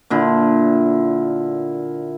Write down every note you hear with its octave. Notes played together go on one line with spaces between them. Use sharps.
A#2 D3 E4